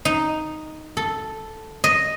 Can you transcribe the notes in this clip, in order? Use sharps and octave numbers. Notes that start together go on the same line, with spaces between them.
D#4
A4
D#5